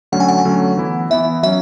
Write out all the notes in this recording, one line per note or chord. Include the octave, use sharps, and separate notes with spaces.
D3 F#3 A3 C#4 F#5
G#5
F#5
D3 F#3 A3 C#4
E3 B3 E4
E3 B3 E4 E5
F#3 C#4 E5